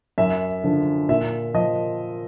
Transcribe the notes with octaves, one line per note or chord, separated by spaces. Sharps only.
F#2 E5
D3 F3
A#2 E5
F3 D#5